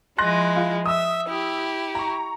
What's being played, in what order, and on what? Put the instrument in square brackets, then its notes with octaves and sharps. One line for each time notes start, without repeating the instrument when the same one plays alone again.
[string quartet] F3 G#3 E4 [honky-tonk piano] C6 F#6 A#6
[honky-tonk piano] F4
[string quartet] E5 [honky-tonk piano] D#6 E6
[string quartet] E4 G4
[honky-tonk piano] A#5 C#6